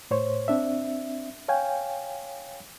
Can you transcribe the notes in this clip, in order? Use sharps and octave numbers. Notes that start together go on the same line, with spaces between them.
A2 C5 C#5
C4 D4 E5
C#5 F5 G5 G#5